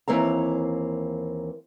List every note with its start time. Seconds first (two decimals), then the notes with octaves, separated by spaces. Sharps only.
0.08 D#2 G#2 E3 A#3 C4 A#5